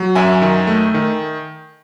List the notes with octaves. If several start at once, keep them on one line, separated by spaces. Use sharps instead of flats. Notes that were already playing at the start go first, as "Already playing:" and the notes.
Already playing: F#3
F#2 E5 G#5
D#3
A3
D#3